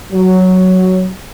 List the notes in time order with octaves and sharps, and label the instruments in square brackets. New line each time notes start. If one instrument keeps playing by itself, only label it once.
[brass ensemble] F#3